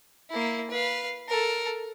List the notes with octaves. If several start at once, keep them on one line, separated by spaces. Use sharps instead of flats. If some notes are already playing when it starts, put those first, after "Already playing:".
A#3 E4
B4 F5
A4 A#4